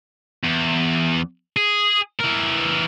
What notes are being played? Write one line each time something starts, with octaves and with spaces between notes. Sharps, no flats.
E2
G#4
E3 A#4